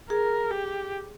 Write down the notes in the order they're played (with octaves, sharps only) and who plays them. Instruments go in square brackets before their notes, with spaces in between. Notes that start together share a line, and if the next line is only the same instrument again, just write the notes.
[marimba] G#4 [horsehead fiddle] A#4
[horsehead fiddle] G4